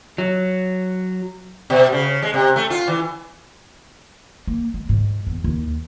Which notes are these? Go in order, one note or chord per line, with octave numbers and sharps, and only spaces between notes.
F#3
B2
C#3
G#3
C3
A3
F4
E3
A#3
G#3
G#2
E2
D#2